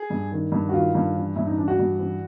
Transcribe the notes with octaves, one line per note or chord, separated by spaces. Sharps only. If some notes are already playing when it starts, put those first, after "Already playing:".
Already playing: G#4
G2
D#3
G2
F#4
D#3 F4
G2
E3
G2 E4
D#4
E3 D4
F#4
G2
E3